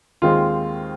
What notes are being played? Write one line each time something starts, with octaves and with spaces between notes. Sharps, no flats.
D#2 D#3 G#3 C4 F4